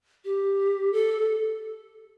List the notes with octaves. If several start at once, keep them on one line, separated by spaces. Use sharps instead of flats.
G4
A4